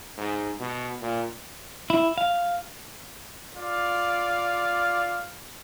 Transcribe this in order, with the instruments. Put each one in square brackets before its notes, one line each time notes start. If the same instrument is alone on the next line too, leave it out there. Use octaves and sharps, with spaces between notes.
[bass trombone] G#2
B2
A#2
[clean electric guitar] E4
F5
[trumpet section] F4 D5 F5